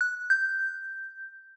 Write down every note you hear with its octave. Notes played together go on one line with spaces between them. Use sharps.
F#6
G6